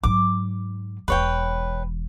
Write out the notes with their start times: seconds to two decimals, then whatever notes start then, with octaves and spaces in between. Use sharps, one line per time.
0.03 G#2 F#3 D6
1.08 E1 E3 B4 C#5 G5